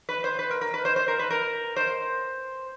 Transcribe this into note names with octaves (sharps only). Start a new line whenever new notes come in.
B4
C5
B4
A#4
A#4
B4
C5
C5
A#4
B4
A#4
C5